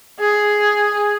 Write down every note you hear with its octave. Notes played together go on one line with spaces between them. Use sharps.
G#4